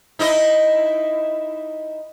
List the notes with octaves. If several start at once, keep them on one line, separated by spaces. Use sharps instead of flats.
D#4 E4 D#5